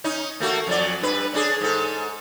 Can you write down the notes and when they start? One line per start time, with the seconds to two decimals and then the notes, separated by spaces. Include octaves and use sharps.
0.04 C#4 D#4
0.40 A3 A#3 F#4
0.67 F2 F#3 D5
1.01 G2 B4
1.33 C#4 D4 G#4
1.61 G#2 A4